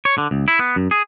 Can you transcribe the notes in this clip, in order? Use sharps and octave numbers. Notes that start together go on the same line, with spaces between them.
C#5
D3
C#2
E4
B3
F#2
G#4